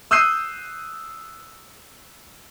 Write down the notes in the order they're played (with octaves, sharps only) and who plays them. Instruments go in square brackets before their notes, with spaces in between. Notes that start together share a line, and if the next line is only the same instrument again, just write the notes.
[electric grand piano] D#6 E6 F#6 G6 C7 D#7